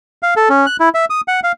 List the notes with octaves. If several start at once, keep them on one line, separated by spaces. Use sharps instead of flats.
F5
A4
C#4
F#6
E4
E5
D#6
F#5
F5